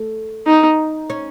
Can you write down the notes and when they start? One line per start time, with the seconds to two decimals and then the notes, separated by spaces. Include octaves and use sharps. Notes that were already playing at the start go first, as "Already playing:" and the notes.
Already playing: A3
0.47 D#4
1.10 C#4